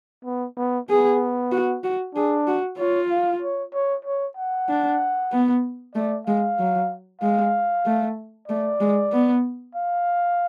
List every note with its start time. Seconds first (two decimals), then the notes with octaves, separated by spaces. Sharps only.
0.25 B3
0.57 B3
0.89 B3 G#4
1.52 F#4
1.84 F#4
2.15 D4 G#4
2.47 F#4
2.78 F4 C#5
3.10 F5
3.42 C#5
3.74 C#5
4.05 C#5
4.37 F#5
4.69 D4
5.32 B3
5.95 A3 D5
6.27 G#3 F5
6.59 F#3
7.22 G#3 F5
7.85 A3
8.48 A3 D5
8.80 G#3
9.12 B3
9.75 F5